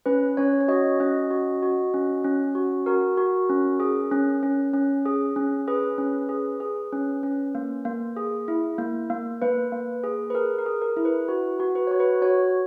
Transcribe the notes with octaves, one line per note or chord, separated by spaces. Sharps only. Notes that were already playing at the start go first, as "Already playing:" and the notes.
C#4 B4
C#4 C#5
C#5
F#4 D#5
C#4 D#5
F#4
F#4
C#4
C#4
F#4
F#4 A#4
F#4
C#4
G#4
C#4
C#4
C#4
G#4
C#4
G#4 B4
C#4
G#4
G#4
C#4
C#4
A#3
A#3
G#4
E4
A#3
A#3
A#3 B4
A#3
G#4
B4
G#4 A#4
A#4
G#4
A#4
E4
B4
F#4 B4
F#4
B4
F#4 C#5
B4
F#4 C#5